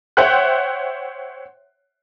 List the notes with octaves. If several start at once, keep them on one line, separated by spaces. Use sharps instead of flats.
C5 C#5 E5 F#5 G5 F#6